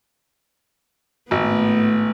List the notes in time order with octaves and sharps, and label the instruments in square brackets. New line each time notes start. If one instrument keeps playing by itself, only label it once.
[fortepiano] G#1 [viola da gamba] A2 A3 B3